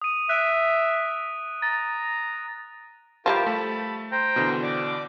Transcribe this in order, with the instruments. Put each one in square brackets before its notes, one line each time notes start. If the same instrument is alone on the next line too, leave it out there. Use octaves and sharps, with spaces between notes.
[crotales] D#6 D#7
[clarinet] E5 [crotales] F#6 D7
[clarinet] A#5 [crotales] A6
[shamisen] F3 G3 E4 [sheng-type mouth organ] F4 G4 A#4
[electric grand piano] A3 [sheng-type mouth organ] A5 B5
[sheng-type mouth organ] C5 G5 A#5
[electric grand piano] B2 D3 E3
[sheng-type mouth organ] D5 D6